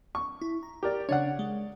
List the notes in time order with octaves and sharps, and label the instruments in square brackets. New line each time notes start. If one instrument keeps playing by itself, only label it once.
[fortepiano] C#6
[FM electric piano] E4
A#5
[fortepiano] G4 A#4 D5
[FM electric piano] C#3 D4 [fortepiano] C#5 D5 F#5
[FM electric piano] G#3